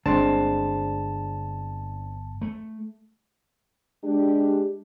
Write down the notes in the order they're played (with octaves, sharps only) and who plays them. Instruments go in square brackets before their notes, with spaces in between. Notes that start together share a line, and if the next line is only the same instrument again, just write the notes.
[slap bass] G1 [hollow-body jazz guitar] G#3 C4 D4 [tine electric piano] A5
[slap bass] A3
[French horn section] G#3 D4 G4